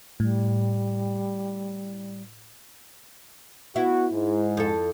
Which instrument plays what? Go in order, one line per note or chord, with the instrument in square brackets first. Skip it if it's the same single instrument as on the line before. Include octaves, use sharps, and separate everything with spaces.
[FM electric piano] A2 [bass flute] G3
[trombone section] B3 F#4 [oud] E4
[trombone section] G#2
[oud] F2 A4